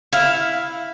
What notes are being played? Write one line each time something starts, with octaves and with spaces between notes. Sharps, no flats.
E4 F5